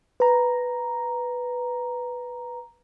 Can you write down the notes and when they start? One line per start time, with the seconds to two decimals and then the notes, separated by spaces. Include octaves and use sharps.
0.20 B4 A#5